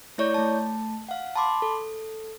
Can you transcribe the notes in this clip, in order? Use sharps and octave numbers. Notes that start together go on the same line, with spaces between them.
A3 E4 C#5 D5 C#6 G6
A3 A5
F5 F#5
A5 B5 C6 D6
A4